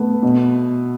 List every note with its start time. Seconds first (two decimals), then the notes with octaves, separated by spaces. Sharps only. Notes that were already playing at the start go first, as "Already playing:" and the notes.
Already playing: A3 B3
0.23 B2